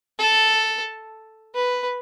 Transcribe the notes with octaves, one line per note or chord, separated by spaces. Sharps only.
A4
B4